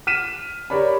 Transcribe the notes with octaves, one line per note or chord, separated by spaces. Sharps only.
F6 B6 D#7 E7
G4 A#4 C#5 D5 B5